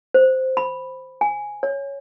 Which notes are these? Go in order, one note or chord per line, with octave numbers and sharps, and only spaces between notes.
C5
B5
G#5
C#5